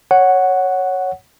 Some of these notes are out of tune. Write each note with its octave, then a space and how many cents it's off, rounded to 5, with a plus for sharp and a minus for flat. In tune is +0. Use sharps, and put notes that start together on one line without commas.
C#5 +0 F#5 +0